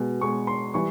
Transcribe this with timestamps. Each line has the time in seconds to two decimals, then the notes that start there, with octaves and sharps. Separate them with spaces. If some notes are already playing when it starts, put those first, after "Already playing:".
Already playing: B2 G#3
0.21 B2 G#3 C#6
0.47 C6
0.74 E3 G3 C#6